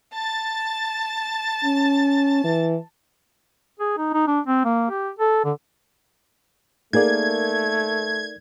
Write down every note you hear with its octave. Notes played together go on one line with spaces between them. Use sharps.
A5 A6
C#4
E3
G#4
D#4
D#4
D4
C4
A#3
G4
A4
D3
A3 A#3 D#4 G#4 A#4 D5 G#6